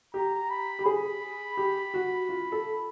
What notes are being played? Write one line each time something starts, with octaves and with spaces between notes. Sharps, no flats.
G4 A#5
B5
G4
G#4 B5
G4
F#4
F4
A4